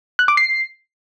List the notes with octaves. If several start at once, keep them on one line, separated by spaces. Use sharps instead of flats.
F#6
D6
C7